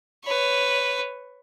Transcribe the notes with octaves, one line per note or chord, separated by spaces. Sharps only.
B4 C#5